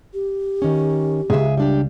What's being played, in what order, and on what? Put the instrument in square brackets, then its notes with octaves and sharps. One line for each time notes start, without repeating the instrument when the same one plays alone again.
[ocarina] G4
[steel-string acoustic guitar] D#3 C#4
[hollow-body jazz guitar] C#2 G#2 [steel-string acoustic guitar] G#4 E5
[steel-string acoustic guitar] G3 D4 G4